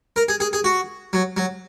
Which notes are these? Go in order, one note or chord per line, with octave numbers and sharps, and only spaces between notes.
A#4
G#4
G#4
G#4
F#4
F#3
F#3